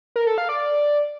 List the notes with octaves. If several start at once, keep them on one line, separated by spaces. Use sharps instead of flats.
A#4
A4
F5
D5